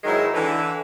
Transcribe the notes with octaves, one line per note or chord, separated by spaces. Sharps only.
G#2 D#3 F#3 G#3 E4
D3 E3